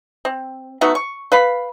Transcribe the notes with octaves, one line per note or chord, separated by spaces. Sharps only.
C4
A3 B3 D#4 F#4
C#6
B4 F5 B5